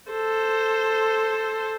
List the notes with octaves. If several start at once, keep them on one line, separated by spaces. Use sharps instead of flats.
A4 C5